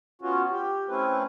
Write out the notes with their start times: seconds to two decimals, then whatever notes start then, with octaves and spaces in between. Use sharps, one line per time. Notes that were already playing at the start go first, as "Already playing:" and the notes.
0.22 B3 C#4 F4 F#4
0.51 G4
0.88 A3 C4 C#4 E4 B4